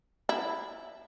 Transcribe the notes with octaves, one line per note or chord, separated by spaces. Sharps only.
E4